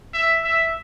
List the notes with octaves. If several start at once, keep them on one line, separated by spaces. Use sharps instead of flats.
E5
E5